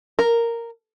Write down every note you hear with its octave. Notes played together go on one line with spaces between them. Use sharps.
A#4